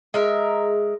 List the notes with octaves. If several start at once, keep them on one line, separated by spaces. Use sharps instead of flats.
G#3 A#4 E5